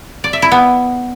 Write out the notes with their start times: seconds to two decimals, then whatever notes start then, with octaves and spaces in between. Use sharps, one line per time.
0.24 D5
0.33 E5
0.42 E4
0.52 B3